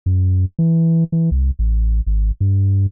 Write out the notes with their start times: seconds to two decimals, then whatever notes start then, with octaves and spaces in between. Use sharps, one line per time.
0.06 F#2
0.59 E3
1.12 E3
1.31 C2
1.59 A1
2.06 G#1
2.40 G2